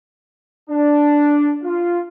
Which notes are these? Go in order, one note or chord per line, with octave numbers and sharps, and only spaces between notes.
D4
F4